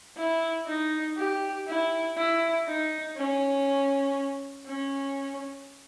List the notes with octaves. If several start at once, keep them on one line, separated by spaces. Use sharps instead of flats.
E4
D#4
G4
E4
E4
D#4
C#4
C#4